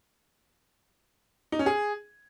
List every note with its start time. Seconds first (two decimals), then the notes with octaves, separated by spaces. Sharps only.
1.52 D#4
1.59 C#4
1.66 G#4